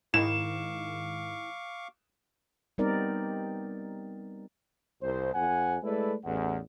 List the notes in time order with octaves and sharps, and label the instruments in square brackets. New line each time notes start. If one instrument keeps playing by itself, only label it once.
[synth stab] G#2 D#3 [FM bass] E4 [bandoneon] F5 C#6 D6 [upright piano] E7
[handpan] G3 B3 C4 D#4 A#4 D5
[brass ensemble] C2 C5
F2 C5 F#5 G#5
G#3 A3 E4 A4 B4 D5
A1 E2 F#5